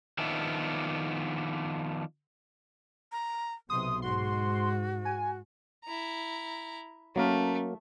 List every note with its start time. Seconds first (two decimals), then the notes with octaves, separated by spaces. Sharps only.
0.19 D#3 F3 B3 D4 E5
3.12 A#5
3.70 B1 C3 C6 D#6
4.02 G#2 F#4 C6
5.05 G#5
5.84 E4 A#5
7.16 F#3 A3 A#3 C#4 A#4